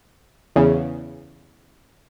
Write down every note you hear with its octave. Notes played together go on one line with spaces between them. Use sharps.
E2 C#3